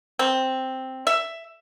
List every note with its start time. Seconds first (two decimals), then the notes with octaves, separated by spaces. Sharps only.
0.19 C4
1.07 E5